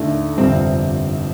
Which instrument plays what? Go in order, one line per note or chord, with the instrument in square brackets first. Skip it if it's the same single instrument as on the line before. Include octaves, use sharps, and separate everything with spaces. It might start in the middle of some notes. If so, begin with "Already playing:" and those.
Already playing: [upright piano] D#2 D3 A3
[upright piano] G1 F2 C3 G3 [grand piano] C4